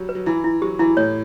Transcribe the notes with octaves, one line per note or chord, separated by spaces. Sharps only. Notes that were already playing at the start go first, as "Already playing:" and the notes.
Already playing: F#3 G3
B4
F#3
E3 E4
E4
F#3 G4
E3 E4
A2 C#5